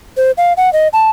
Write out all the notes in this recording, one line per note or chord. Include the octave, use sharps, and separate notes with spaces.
C5
F5
F#5
D#5
A5